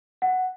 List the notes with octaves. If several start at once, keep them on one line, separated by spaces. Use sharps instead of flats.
F#5